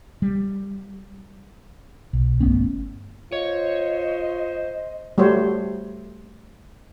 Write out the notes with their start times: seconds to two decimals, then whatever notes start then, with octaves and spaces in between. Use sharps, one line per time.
0.22 G3
2.13 B1
2.40 G1 A3 B3 C#4
3.32 F4 C5 C#5 D#5
5.18 G3 A3 F#4 C5 C#5